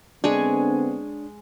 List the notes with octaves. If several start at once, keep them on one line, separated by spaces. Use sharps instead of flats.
D3 G#3 B3 C4 D4 G#4 C#5